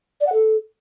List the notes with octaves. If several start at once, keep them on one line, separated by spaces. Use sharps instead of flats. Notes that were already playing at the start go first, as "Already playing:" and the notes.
D5
F#5
A4